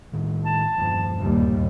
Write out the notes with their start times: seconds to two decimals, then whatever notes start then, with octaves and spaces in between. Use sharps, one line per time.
0.13 A2 D#3
0.45 A5
0.78 E1 G2 F3
1.19 D#2 A#2 G3